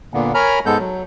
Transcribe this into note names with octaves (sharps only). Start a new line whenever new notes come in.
A#2 D3 A#3 B3
A#4 C#5 G#5 A#5 B5 F6
G#2 G#3 B3 A4 G6
F#3